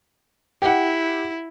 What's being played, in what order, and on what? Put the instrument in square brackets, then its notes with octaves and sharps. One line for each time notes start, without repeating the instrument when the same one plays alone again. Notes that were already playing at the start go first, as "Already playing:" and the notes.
[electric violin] E4 [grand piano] G4 F#5